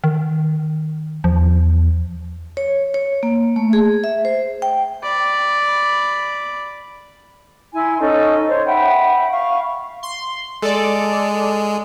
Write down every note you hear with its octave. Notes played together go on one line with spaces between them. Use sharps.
D#3
E2 F3
C#5
C#5
A#3
A3
G#4
E5
C5
G5
D5 B5
E4 G#5 C6
C#4 D#4 A4
C5 C#5
E5 F#5 G5 B5
F5 C#6
C6
G#3 A4 D5